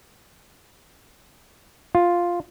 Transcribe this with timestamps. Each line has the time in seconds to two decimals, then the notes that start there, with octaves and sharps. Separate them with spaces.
1.95 F4